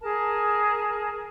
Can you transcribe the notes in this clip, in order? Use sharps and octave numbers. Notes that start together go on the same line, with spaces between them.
G#4 A#4 A5